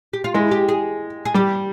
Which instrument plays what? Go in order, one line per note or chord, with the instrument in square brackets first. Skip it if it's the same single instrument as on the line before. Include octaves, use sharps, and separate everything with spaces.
[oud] G4
F4
[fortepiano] G#3 [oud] E4
[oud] G4
G#4
G#4
[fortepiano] G3 [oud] G4